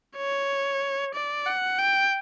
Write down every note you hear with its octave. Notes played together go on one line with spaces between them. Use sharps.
C#5
D5
F#5
G5